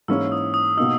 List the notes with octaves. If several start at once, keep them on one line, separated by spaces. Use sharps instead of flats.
G#2 E3 A#3 C#4 E4 E6
D#6
D#6
B2 A#3 D#4 E6